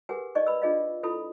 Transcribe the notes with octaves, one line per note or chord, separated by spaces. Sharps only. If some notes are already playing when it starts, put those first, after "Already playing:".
G4 G#4 A#4 B4 F#5 G#5
D#4 D5 D#5 C#6
B4 B5 E6
D4 F4 G#4 D#5 F5
E4 F4 A4 B5 D#6